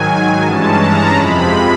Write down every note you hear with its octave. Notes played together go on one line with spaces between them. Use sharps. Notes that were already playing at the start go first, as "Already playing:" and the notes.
Already playing: G#2 D#3 F#3 G#5
G2 E3 G#3 C#4 A5
A#5
F2 C3 F3 G#3 B5